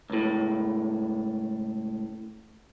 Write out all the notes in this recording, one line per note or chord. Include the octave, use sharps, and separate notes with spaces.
C#2 A2